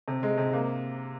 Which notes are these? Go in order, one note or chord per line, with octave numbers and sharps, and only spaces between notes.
C3
G#3
C3
A#3